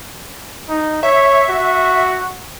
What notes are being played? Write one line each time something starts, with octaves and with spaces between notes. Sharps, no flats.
D#4
C#5 E5
F#4